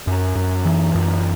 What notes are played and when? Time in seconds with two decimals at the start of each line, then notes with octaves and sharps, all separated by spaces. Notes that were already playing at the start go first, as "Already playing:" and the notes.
0.07 F#2
0.36 F#2
0.65 E3
0.95 F#2